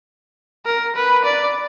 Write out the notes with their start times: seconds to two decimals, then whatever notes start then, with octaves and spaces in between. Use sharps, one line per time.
0.66 A#4
0.96 B4
1.25 D5